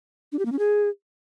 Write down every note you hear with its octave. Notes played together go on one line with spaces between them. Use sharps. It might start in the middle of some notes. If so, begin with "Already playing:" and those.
D4
G4
A#3
C#4
G#4